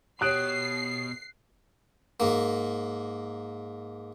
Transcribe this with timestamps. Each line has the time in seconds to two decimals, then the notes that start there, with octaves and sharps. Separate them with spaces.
0.21 B2 G4 C#5 D#6 F#6 C7 D7
2.20 G#2 A#3